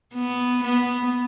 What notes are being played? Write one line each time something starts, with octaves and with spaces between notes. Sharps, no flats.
B3
B3